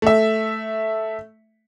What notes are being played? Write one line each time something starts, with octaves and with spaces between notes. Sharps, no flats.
A3 E5